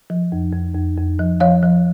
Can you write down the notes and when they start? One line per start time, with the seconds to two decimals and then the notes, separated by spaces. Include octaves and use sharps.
0.10 F3
0.32 F2
0.53 F2
0.75 F2
0.97 F2
1.19 F3
1.40 F3 C#5 F5
1.63 F3